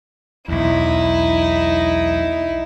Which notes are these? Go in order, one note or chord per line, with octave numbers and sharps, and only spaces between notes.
B1 E2 D#4 E4